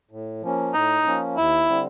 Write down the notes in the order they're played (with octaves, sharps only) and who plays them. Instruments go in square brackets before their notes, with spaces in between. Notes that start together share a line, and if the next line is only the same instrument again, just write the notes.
[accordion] A2
F3 A#3 C#4
[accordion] A2 [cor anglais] D#4
[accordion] F3 A#3 C#4
[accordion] D#2 [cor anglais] E4
[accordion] D3 G3 C4